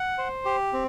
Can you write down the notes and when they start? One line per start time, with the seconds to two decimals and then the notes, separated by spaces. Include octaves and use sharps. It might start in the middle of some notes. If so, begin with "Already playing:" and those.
Already playing: F#5
0.18 C5
0.45 G4
0.73 C4